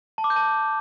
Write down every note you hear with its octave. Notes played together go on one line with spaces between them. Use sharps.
A5
D6
G6
A5